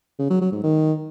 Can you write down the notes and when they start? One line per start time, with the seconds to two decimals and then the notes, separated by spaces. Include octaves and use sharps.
0.19 C#3
0.30 F#3
0.41 F#3
0.52 G#2
0.63 D#3